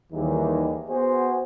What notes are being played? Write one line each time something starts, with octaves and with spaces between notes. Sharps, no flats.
D#2 D#3 E3 G3 D#4 G#4
B3 F#4 G#4 C5